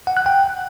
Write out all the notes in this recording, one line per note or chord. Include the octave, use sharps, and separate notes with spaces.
F#5
F#6
G5